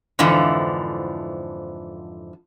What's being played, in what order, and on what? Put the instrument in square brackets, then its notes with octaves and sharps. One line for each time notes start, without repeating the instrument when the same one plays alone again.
[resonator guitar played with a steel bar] F2 G#2 D3 E3 F3